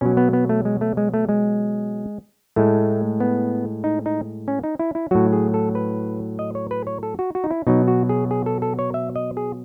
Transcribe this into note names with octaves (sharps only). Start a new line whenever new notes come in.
B2 F#3 C#4
B3
B3
A3
G#3
A3
G#3
A3
G#3
A2 G#3 A3
B3
D#4
D#4
C#4
D#4
E4
E4
A2 F#3 F#4
G#4
A4
B4
D#5
C#5
B4
C#5
A4
F#4
F#4
D#4
E4
B2 F#3 D#4
F#4
G#4
G#4
A4
A4
C#5
E5
D#5
G#4